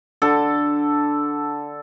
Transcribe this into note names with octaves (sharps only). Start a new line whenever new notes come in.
D3 A4